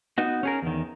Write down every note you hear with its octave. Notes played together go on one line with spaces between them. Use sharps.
B3 D#4 F#4
C#4 G#4 A#4
E2 D#3